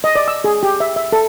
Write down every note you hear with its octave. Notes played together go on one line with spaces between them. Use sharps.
D#5
D5
E6
G#4
G4
E5
E5
A4